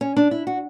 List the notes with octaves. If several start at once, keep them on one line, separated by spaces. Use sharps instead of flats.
C#4
D4
E4
F#4